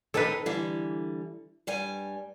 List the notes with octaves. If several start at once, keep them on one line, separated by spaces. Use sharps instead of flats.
D#3 C4 D#4 A4 B4
D3 E3 G3
G2 G3 G#5